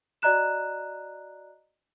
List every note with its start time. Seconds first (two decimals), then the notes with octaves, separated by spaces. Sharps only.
0.22 F#4 D5 D#5 A#5 F#6 E7